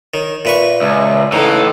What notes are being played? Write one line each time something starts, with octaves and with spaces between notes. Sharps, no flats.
D#3 C#5
A#2 B4 E5 C#6
C#2 E5
A2 C#3 E3 D#4 A4 B4